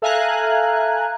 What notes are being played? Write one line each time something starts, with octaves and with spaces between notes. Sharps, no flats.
A4 E5 F5 G#5 A#5 F#6